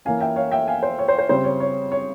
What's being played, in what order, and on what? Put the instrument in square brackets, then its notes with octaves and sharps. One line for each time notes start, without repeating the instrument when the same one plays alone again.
[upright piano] E3 A#3 C#4 F5 G#5
E5 G5
C#5 F5
E5 G5
F5 G#5
C5
C#5
C5
C5
C#3 G3 C4 C5
C#5
C#5
C#5